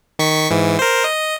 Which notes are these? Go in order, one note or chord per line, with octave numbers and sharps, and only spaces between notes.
D#3 C#6 B6
G#2 E3
A#4 C5
D#5